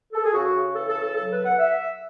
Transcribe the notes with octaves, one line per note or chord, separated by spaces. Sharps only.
A4
G#4
C#3 F#4
C#3
E3 A4
A4
C#3
A4
F#3 A4
B4
B2
F#5
E5